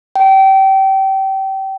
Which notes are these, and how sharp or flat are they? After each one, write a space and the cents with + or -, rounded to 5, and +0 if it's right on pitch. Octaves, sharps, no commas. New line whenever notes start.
G5 -25